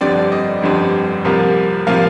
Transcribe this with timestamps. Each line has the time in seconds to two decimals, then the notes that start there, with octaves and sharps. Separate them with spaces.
0.01 G1 F2 D3 G3 C4 D5
0.32 D#5
0.62 G1 F2 D3 G3 C4
1.24 C2 C3 F3 A#3
1.87 C3 F3 A#3 F5